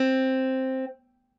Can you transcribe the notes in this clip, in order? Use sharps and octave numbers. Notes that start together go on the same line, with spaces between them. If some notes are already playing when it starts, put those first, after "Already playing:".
Already playing: C4